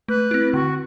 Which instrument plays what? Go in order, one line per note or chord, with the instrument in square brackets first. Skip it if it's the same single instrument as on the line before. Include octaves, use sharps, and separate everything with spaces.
[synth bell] A3 [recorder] B4
[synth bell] C4 E4
[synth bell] D3 [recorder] F#4